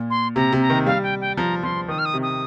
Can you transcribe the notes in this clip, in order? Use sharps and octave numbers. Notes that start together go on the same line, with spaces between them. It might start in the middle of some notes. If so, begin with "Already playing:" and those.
Already playing: A#2
C6
C3 A#5
C3
A#5
D#3
G3 F5
G5
G5
F3 A#5
F3 C6
D#3 D#6
F6
D#6
C3
D#6